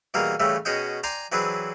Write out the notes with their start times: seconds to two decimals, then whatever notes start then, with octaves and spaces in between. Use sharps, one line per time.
0.14 B2 E3 G3 A#3 G#4 A#4
0.40 A2 C#3 E3 G3 A3
0.65 B2 C#4 F#4 G#4 D#5 G5
1.03 D5 G5 G#5 A#5 C6 D6
1.32 E3 F#3 C4 D4 G#4 B4